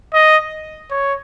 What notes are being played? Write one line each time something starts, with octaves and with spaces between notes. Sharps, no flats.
D#5
C#5